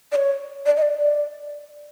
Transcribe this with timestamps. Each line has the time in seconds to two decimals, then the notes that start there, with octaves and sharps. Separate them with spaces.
0.12 D5
0.16 C#5
0.66 D5
0.77 D#5
0.82 D5
1.00 D5